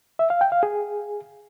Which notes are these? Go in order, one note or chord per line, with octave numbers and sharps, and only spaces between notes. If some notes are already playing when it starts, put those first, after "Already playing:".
E5
F5
G5
F5
G#4